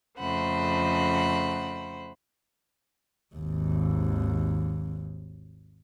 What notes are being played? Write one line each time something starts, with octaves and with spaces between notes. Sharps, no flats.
F2 C#3 A3 C5 F#5 B5
G#1 D#2